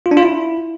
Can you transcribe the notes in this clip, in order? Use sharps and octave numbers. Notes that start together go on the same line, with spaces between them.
F4
D4
F4
E4